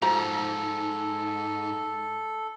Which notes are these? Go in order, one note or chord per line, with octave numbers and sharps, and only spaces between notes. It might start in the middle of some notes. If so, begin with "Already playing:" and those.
G#2 F3 F#4 A4 A#5